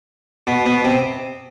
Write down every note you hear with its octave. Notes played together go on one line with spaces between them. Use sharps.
B2 B3
B2 B3
C3 C4